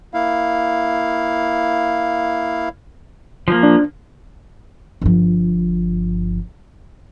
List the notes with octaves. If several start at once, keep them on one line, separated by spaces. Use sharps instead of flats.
A#3 E4 F5
F3 A#3
D4
G1 F3